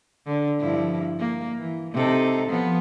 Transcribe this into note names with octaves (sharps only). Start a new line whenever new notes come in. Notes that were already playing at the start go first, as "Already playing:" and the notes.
D3
G2 F3 E4
A#3
E3
C3 D#4 A4
F3 B3